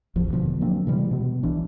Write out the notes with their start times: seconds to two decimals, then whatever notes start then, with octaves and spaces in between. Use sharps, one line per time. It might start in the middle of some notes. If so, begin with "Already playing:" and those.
0.16 A1 E2 F3
0.33 B2 D3 F3
0.61 F#3 A#3 C4 D4
0.87 C3 E3 G3 G#3
1.11 B2
1.43 B1 E3 D4